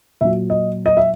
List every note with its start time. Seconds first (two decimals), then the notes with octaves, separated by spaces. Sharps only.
0.21 A#2 F#3 E5
0.50 D#5
0.86 D#5
0.97 E5